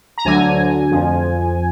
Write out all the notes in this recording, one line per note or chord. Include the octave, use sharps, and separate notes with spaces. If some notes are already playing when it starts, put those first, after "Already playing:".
A#5
D2 D3 F#3 G#5
F2 F3